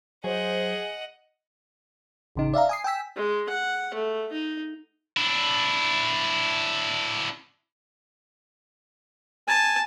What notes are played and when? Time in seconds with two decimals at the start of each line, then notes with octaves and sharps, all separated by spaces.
0.24 F#3 G#4 C5 D#5 F#5
2.36 A1 C#3 D#4
2.54 D5 E5 F5 A#5
2.69 G#5 D#6 C7
2.84 G5 G#5 E6 B6
3.16 G#3
3.49 F#5
3.94 A3
4.32 D#4
5.17 D4 E4
9.48 G#5 A5